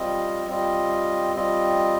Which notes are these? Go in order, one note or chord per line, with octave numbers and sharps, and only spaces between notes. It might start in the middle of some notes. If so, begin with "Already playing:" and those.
Already playing: G3 C4 F4 D#5
G3 C4 F4 D#5
G3 C4 F4 D#5